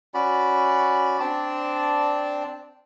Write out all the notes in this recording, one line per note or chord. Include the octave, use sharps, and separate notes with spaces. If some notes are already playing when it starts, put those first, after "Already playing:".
C#4 F#4 D5 B5
C4 D4 D5 A5